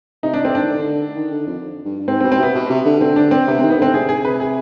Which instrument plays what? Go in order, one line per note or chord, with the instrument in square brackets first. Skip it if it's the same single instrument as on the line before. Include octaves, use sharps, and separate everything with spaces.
[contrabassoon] C3 [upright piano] D#4
[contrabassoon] C3 [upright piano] D4
[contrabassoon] D3 [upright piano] C4
[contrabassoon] D#3 [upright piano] D4
[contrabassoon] D3
D#3
D3
F2
G2
G2
[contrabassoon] G#2 [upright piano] C4
[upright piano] C4
[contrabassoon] B2
[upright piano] C4
[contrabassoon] C3 [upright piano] B3
[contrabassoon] B2
C3
D3
[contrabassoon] D3 [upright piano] C4
[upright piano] D4
C4
[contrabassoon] C3 [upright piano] B3
[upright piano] C4
[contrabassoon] D#3
[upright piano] B3
[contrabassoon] D3 [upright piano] C4
[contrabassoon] C3 [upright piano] G#4
[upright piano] G#4
B4
G#4